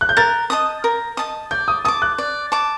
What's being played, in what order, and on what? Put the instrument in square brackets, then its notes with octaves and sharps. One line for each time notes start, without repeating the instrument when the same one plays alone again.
[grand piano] F#6
G6
[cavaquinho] A#4 [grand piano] A6
[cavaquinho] D#5 A5 D#6
A#4
D#5 A5 D#6
[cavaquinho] D5 [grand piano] G6
[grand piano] D#6
[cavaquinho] A5 D6 [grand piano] D#6
[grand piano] F#6
[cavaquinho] D5
A5 D6